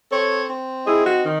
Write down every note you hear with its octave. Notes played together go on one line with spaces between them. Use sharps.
C4 A4 C#5
C4
D#4 E4 G#4
F#4
D#3